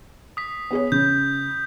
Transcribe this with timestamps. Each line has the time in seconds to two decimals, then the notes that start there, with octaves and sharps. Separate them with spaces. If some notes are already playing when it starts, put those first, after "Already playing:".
0.37 D#6 B6
0.71 B3 G#4 C#5
0.92 C#3 G6